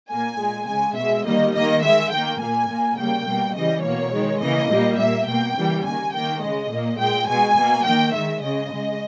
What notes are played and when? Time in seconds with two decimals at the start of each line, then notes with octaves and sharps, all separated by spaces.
0.10 A#2 A#3 G#5
0.39 A#2 G#3
0.67 C#3 G#3 G#5
0.96 B2 G#3 E5
1.25 D#3 G3 A#3 D#5
1.54 D#3 A#3 D#5
1.82 D#3 G#3 E5
2.12 D#3 A#3 G5
2.40 A#2 A#3 G#5
2.69 A#2 A#3
2.98 C#3 G3 A#3 G5
3.26 B2 G3 A#3
3.55 C#3 E3 G3 D#5
3.83 B2 A#3 C#5
4.12 D#3 G#3
4.41 C#3 E3 A#3 D#5
4.70 A#2 G3 A#3
4.98 A#2 A#3 E5
5.27 B2 A#3 G5
5.56 C#3 E3 G3 A#3
5.84 D#3 A#3 G#5
6.13 D#3 A#3 G5
6.42 C#3 G#3 D#5
6.71 A#2 A#3
6.99 A#2 G#3 G5
7.28 B2 G#3 G#5
7.57 B2 A#3
7.85 D#3 A#3 G5
8.14 D#3 G#3 E5
8.42 C#3 G#3 D#5
8.71 C#3 G#3